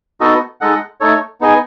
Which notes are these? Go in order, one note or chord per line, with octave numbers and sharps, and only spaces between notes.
B3 D#4 F#4 A4 D#5
G#3 D#4 A4 D#5 F#5
A3 D#4 A4 C#5
B3 D#4 G#4 D#5 G#5